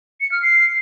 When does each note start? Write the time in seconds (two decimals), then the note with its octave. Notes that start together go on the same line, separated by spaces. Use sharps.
0.21 C#7
0.32 F6
0.43 C7